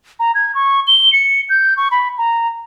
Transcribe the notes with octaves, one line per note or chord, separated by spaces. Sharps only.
A#5
G#6
C#6
G7
C#7
G6
C#6
B5
A#5